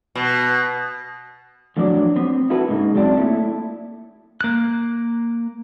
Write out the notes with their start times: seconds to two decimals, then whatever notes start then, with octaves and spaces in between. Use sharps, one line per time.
0.15 B2
1.77 A2 F3 F#3 D4 D5
2.16 B3 C4
2.50 E4 F#4 A4 B4
2.69 G#2 C#3 A#3 D#4
2.95 F#3 C4 E4 D5 G#5 A5
3.17 A3 A#3 E4
4.41 A#3 F#6